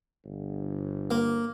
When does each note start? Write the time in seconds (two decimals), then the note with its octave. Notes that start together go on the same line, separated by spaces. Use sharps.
0.25 G1
1.11 A#3